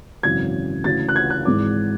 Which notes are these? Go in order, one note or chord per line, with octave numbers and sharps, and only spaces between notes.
G#1 F#2 C#3 E3 G#6
D2 C#3 E3 A6
F#6
G#6
F#6
G#1 G#2 E3 D6